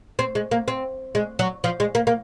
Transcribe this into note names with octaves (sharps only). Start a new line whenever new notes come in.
C4
G#3
A#3
C4
G#3
F#3
F3
G#3
A#3
A#3